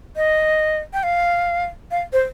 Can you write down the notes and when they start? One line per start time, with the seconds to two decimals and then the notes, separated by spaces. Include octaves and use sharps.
0.16 D#5
0.93 G5
1.03 F5
1.91 F5
2.13 C5